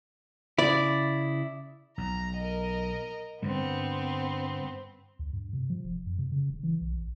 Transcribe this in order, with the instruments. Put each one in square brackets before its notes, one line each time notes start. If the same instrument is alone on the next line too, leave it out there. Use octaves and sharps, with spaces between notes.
[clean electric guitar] C#3 E4 [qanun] D5
[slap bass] B1 [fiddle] A#5
[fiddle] A#4 D#5
[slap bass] G2 D3 G3 [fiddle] B3 C4
[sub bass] D2
G2
C3
F3
D#1
F#2
C3
C#3
D1
E3
B1
A1